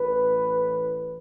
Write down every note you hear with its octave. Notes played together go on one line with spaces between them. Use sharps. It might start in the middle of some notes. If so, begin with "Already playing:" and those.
Already playing: A1 A2 E3 B4